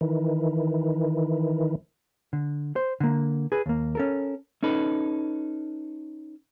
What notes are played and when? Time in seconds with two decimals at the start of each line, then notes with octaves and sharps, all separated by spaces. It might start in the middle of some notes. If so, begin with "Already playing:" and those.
0.01 D#3 E3
2.33 D3
2.76 C5
3.00 D3 A#3
3.52 G#4 B4
3.66 D#2 A#3
3.95 C#4 A4 A#4
4.63 C#4 D#4 A4 B4